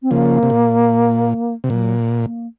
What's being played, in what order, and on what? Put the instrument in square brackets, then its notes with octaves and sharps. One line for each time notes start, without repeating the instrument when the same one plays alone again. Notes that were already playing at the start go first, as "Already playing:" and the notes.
[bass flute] C4
[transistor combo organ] C#3 F3 [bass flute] A#3
[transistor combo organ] C3
A#2
C3
[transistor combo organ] A#2 [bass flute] F#3
[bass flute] A#3